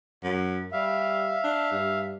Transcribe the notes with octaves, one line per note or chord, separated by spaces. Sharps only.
F#2
G3 E5 F5
D4
G2